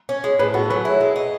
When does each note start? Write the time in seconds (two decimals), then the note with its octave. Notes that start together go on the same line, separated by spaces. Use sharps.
0.09 C#4
0.24 G#3
0.39 A2 G#4 B4
0.54 B3 F#4 A4
0.70 F#3 G#4 B4
0.85 E4
1.01 G#3
1.16 D#4